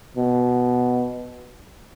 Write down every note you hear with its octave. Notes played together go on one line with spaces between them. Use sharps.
B2